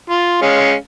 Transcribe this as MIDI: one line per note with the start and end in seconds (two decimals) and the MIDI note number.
0.09 0.39 65
0.42 0.74 56
0.42 0.74 61
0.42 0.74 77